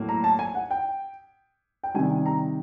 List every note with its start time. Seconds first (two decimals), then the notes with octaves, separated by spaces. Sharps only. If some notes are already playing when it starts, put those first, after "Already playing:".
Already playing: A2 F#3 A#3
0.09 A#5
0.24 A5
0.39 G#5
0.55 F#5
0.71 G5
1.84 G5
1.94 C3 D#3 G3 G#5
2.26 A#5